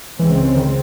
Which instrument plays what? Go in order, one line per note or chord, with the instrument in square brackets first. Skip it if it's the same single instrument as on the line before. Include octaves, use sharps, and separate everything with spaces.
[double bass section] C#2 C#3 G#3 C4 [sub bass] E3
[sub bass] D#3